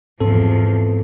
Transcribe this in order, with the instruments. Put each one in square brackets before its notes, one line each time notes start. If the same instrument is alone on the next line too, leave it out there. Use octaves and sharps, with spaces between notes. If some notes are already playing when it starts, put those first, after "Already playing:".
[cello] E2 F3 [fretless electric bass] G#2 C4 [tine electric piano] A4